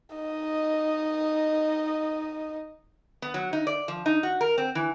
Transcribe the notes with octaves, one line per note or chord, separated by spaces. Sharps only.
D#4 D#5
B3
F#3
D#4
D5
F3
D#4
F#4
A#4
C4
E3